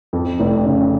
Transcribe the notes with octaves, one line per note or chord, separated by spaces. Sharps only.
F2
F1
C#3